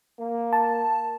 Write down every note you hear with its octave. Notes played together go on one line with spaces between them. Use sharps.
A#3
A5